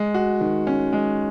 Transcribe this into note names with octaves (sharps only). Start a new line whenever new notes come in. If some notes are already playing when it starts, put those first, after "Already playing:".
Already playing: G#3
F#4
D#3
C#4
G#3